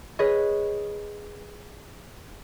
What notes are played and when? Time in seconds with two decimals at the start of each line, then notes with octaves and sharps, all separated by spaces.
0.19 G#4 B4 C#5 D#5